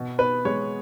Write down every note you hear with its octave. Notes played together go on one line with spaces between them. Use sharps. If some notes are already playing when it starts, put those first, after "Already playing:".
Already playing: B2
B3 B4
G#3 C#5